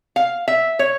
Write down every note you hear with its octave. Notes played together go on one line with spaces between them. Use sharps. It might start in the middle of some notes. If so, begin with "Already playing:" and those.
F5
E5
C#5